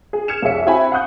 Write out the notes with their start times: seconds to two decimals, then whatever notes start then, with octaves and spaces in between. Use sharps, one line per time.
0.13 G#4
0.28 F6 G#6 C#7 E7
0.42 C2 F2 G#4 C#5 E5 C#7
0.66 C4 E4 F#4 G5 G#5 B5
0.92 F5 F#5 C#6 D#6 F#6 G6